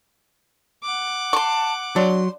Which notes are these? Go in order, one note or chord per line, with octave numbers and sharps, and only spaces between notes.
F#5 D6
A5 C6 C#6
F#3 D4 C6